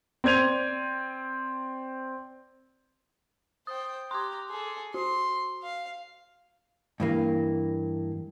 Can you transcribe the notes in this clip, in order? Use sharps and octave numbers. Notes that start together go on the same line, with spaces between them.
C4 D5 G#6 D#7 F7
C5 G5 D#6
G4 A#5 C6 D6
G#4 A4
F#4 C6
F5
G2 E3 A#3